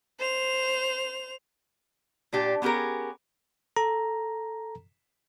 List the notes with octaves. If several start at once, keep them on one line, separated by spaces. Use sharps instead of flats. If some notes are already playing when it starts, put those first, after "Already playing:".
C5 F7
A#2 D4 G4
B3 C#4 G4 G#4 A#4
A4 A#5